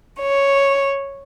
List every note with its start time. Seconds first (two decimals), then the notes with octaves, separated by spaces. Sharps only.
0.19 C#5